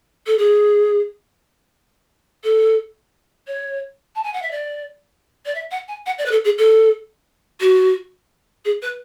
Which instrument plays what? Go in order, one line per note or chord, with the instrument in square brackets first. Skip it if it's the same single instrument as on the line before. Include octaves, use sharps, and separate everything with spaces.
[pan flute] A4
G#4
A4
C#5
A5
G#5
F#5
E5
D5
D5
E5
F#5
G#5
F#5
D5
B4
A4
G#4
A4
F#4
G#4
B4